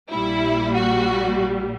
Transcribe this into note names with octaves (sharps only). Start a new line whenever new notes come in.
A#1 A#2 G3 E4
F#4